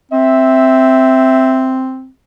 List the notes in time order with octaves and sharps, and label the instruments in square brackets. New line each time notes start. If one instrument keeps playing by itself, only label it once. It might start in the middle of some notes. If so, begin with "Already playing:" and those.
[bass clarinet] C4 [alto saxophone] E5